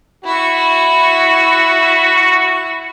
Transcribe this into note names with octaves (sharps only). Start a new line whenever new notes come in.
E4 F#4 E5